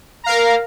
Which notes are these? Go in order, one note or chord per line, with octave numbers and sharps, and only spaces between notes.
A#4 F5 A#5